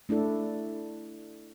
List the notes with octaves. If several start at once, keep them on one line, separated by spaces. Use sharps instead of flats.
A3 D4 E4 A4